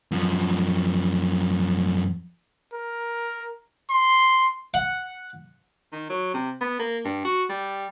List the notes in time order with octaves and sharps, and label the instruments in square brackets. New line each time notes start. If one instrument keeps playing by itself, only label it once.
[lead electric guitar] F#2 F3
[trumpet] A#4
C6
[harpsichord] F#5
[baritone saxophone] D#3
F#3
C3
B3
A#3
G2
F#4
G3